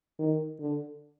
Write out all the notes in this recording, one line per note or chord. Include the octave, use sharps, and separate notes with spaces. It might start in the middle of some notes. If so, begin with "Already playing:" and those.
D#3
D3